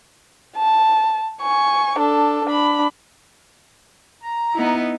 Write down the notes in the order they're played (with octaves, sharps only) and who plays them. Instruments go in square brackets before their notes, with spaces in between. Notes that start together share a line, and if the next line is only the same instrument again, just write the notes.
[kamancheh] A5
G#5 C#6
D4 A4
D4 B5
[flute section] A#5
[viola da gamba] B3 D#4 E4